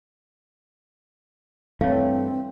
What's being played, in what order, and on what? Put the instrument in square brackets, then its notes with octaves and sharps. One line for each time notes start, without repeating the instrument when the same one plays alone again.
[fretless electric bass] G2 E3 A3 [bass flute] C4 [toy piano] C#5 F5